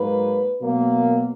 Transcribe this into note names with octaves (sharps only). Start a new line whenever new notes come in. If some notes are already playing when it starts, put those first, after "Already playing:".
Already playing: G#2 F#3 A#3 B4
B2 F#3 A#3